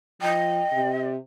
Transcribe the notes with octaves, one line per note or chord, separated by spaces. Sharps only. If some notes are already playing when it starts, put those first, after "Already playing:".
F3 D#5 G5
C3